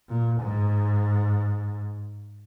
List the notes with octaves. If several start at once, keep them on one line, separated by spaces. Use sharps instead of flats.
A#2
G#2